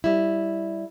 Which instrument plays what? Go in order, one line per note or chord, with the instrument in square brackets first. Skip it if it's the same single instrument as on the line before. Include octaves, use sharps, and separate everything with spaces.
[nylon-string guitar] G3 E4